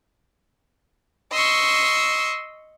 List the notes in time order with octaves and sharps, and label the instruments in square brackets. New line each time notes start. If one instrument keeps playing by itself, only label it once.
[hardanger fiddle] D#5 C#6 [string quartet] C6 E6